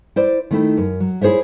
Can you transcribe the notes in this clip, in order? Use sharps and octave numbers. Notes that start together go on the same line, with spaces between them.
E4 C5 D5
D#3 A3 E4
F#2
F#3
E4 G#4 C5 C#5 E5